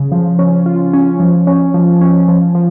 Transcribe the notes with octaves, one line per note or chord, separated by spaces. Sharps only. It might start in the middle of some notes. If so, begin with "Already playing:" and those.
Already playing: C#3
F3
C#4
F4
C#4
F3
C#4
F3
C#4
F3
F3